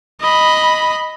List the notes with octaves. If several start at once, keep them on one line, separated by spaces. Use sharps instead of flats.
D#5 B5